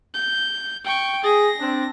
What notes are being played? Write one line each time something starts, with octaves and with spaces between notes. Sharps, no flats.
G6
G5 C#6
G#4 A#6
C4 D4